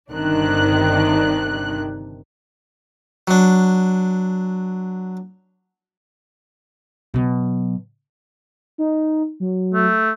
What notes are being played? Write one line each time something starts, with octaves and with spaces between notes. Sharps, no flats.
G1 C3 D#3 D4 F#6
F#3 D4
B2 F#3
D#4
F#3
A3